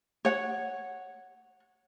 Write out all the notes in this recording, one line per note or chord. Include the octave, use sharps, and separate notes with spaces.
C#5 F#5